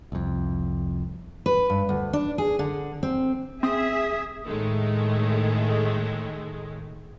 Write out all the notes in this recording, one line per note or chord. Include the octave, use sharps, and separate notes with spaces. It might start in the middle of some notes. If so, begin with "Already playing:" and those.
C2 F2
B4
G2
D2
D4
G#4
D3
C4
C4 G#4 E5 D#6
A2 D#3 G#3 A3